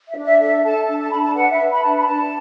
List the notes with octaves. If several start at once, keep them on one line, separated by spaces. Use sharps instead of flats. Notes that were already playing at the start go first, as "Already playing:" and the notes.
E5
D4
E5
A4 E5
A4 A5
D4 A5
A5
D4 B5
A5
B4 F#5
E5
B4
B5
D4 A5
B5
D4 A5